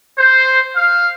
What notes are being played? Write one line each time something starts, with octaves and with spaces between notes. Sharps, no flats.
C5
F5